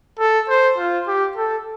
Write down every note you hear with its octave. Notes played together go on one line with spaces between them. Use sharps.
A4
C5
F4
G4
A4